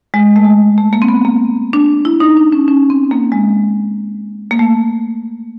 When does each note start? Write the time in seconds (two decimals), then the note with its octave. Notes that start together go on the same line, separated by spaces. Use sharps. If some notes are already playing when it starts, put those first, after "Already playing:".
0.14 G#3
0.36 A3
0.45 G#3
0.78 A3
0.93 A#3
1.02 C4
1.09 B3
1.25 A#3
1.73 D4
2.05 E4
2.20 D#4
2.37 D4
2.52 C#4
2.68 C#4
2.90 C4
3.11 A#3
3.32 G#3
4.51 A#3
4.59 A3